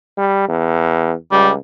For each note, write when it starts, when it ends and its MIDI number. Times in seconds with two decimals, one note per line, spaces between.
0.17 0.45 55
0.49 1.13 40
1.32 1.57 37
1.32 1.50 55